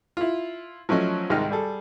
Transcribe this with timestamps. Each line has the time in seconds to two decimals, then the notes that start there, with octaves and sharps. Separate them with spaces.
0.17 E4 F4
0.89 F3 F#3 A3 C#4 D#5
1.30 C2 G#2 D#3 D#5 F6
1.51 G3 G#4 A4